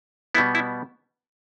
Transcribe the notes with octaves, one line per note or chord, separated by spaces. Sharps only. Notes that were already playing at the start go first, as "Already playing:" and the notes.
B2 G3 B3 E4
E4